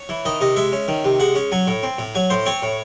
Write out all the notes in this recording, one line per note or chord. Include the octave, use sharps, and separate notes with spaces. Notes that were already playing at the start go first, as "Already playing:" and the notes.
Already playing: C#5
E3
D#3 D#5
C3 D#5
G#3 E5
C#4
D#3
C3
G#3 F#5
C#4
F#3 G#5
A2
C4
A2
F#3 G#5
A2 C5
C4 C#5
A2